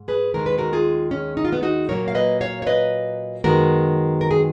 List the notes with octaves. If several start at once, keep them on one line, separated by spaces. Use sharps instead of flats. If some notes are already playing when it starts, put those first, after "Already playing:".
Already playing: G#2
G#4 B4
D#2 D#3 G#3 A#4
B4
F#4 A#4
F4 G#4
C#4
D#4
F4
B3 D#4
D#4 F#4
A#2 F#3 A#3 A#4 C#5
F5
B4 D#5
C#5 F5
C#5
B4 D#5
F#2 D#3 G#3 B3 F#4 A#4
A#4
G#4